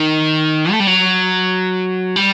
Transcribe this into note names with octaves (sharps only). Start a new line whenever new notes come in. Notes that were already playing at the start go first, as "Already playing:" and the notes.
Already playing: D#3
A3
G3
F#3
G3